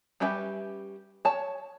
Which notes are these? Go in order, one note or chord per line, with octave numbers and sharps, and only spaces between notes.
G3 C#4 G4 B4 E5
C#5 A5